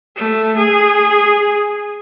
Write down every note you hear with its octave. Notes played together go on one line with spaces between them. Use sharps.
A3
G#4